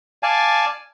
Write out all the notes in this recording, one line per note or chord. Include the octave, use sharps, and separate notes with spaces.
D5 F5 G#5 A5